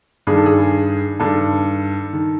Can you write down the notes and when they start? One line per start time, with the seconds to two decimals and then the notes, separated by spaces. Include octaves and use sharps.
0.27 G2 D#3 G#4
0.37 A4
0.46 G#4
1.20 G2 D#3 A4
2.13 D#3